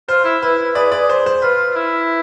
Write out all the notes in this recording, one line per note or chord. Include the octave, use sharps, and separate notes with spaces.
F4 C5
E4
E4 B4
E4
G#4 B4 D5
B4 D5
C5
C5
F4 B4
F4
E4